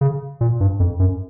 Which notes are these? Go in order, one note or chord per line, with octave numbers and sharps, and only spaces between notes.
C#3
A#2
G2
F2
F#2